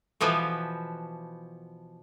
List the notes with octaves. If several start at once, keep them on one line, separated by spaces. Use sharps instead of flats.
B2 E3 F3 B3